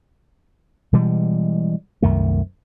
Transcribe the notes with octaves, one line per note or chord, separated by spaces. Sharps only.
B2 E3 G3 G#3
C2 F#2 D#3 A3